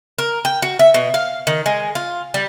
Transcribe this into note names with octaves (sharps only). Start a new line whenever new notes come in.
A#4
G5
F#4
E5
B2
F5
D#3
G#3
F4
G3